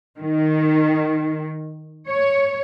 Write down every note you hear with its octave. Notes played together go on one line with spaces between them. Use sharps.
D#3
C#5